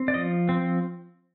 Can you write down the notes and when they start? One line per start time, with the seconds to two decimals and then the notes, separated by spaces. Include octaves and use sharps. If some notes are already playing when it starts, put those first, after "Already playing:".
Already playing: C4
0.08 D5
0.14 F3 D#5
0.49 C4